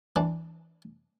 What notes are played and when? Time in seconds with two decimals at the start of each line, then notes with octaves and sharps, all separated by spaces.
0.16 E3 D4